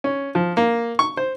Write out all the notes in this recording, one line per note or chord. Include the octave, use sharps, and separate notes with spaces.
C#4
F3
A#3
C#6
C5